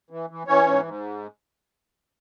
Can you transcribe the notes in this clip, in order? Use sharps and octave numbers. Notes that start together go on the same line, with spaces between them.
E3
E3
E3 C#4 C#5
G#2
G#2